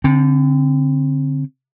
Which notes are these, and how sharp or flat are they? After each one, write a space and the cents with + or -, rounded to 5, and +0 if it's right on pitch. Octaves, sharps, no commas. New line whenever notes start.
D3 -20 C4 +15